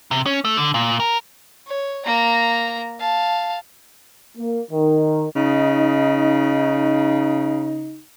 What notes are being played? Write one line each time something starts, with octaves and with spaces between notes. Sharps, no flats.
C3
C#4
A3
D3
A#2
A#4
C#5
A#3 A#5
F5 A5
A#3
D#3
C#3 D#4